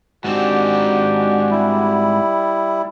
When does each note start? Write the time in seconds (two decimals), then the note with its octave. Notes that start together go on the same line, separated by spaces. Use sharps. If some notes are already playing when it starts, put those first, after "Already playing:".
0.24 G#2 C4 D4 F#4 G4
1.51 G3 E4